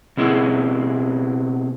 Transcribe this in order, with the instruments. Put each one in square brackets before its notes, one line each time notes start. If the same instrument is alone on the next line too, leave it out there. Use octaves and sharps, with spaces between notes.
[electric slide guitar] B2 C4 E4 G#4